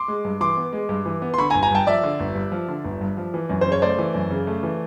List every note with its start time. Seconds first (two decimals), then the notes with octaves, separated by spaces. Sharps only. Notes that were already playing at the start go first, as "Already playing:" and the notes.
Already playing: C6 D6
0.08 G#3
0.25 G2
0.41 E3 C6 D6
0.57 B3
0.73 G#3
0.89 G2
1.06 E3
1.22 B3
1.34 C6
1.38 D3 B5 C#6
1.50 G#5 A#5
1.54 G1
1.63 G#5 A#5
1.71 G2 G5 A5
1.87 F3 D5 E5
2.03 D3
2.20 G1
2.35 G2
2.52 F3
2.68 D3
2.85 G1
3.01 G2
3.17 F3
3.34 E3
3.49 F#2
3.61 C#3 C5
3.72 C#5
3.82 A3 C5 D5
3.99 E3
4.14 F#2
4.30 C#3
4.47 A3
4.63 E3